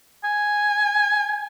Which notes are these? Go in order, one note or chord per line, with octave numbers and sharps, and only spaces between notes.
G#5